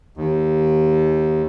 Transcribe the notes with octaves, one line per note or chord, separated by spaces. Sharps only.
D#2